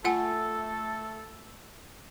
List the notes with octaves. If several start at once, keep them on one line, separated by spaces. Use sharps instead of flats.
A3 F4 A4 F#5 G#5